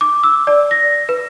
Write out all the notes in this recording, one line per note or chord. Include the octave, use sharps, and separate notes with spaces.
D6
E6
D5
A#6
B4